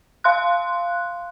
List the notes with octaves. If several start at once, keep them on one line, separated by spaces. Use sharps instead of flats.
F5 C6 F#6